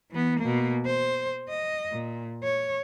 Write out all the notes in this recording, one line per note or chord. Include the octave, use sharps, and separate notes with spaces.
E3 B3
B2 A#3
C5
D#5
A#2
C#5